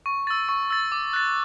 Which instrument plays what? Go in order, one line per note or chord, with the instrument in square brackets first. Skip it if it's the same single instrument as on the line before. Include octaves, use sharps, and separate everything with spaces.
[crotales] C#6
E6 A6
C#6
E6 A6
D6
F#6 A6